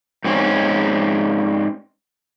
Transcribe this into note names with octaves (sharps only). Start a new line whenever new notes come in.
G#2 C4 C#4